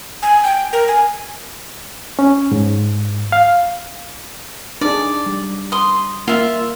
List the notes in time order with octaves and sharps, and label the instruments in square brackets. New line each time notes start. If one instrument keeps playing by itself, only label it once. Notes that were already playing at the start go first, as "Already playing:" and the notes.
[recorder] G#5
G5
A#4
G#5
[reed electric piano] C#4
G#2
F5
[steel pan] D4 D#4 G#4 [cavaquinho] D5
[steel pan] G3
[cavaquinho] C6 D#6
[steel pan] A#3 [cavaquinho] F4 E5